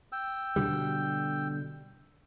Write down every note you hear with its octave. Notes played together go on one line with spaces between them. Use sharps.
G5 E6
B2 D3 G3